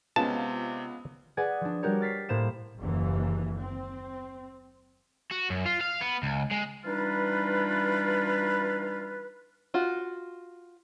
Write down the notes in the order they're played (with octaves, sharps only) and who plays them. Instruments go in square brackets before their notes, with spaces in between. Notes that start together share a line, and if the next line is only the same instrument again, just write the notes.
[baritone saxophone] C3 [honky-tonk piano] G#3 C#4 F4 [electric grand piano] B3 [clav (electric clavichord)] A5
[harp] G#4 B4 D5 F#5 G#5
F3 D4
G3 F#4 G4 A#4 C#5
F6 A6 B6 C7
A2 A#3 C5 F5 E7
[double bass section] F#1 D#2 E3
C4
[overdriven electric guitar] F#4
F#2
F4
F5
B3
C#2
G#3
[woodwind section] E3 G3 D4 D#4 F4 B4
[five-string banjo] F4 F#4